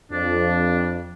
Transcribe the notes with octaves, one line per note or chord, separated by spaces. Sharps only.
F2 D4